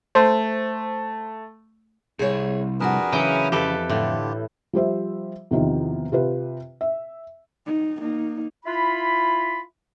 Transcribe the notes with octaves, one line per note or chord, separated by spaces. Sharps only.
A3 C5
C2 G#4 C#5
F2 D4 F#4 G#4 A#4 B4
C#3 E3 F#3 C#4 G5
F2 G4 A4 B4
A2 D3 F4 G4
F3 G3 C5 E5
E2 C3 D#3 F3 C4
C3 F4 G4 B4
E5
D#4
A#3 D#4
E4 F4 B5